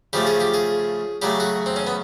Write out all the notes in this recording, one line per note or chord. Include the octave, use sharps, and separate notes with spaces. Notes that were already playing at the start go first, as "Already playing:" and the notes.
C#3 F3 A3 G4
G#4
G4
G#4
C#3 F#3 A3 G4
F#4
C4
C#4
B3